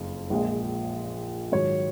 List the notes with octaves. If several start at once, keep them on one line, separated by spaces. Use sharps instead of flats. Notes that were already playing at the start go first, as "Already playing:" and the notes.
Already playing: F#1 F2 F3
A#1 A#2 G#3
G#2 D#3 F#3 C#5